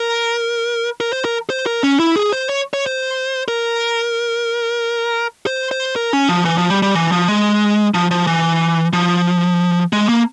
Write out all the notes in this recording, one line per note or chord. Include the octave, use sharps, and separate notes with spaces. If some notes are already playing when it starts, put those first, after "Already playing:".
Already playing: A#4
A#4
C5
A#4
C5
A#4
C#4
E4
G#4
C5
C#5
C#5
C5
A#4
C5
C5
A#4
C#4
F3
E3
F3
G3
G3
E3
F3
G#3
F3
F3
E3
F3
G#3
A#3